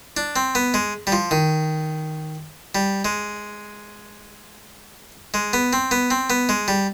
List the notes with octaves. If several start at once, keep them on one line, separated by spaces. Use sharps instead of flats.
D4
C4
B3
G#3
G3
F3
D#3
G3
G#3
G#3
B3
C4
B3
C4
B3
G#3
G3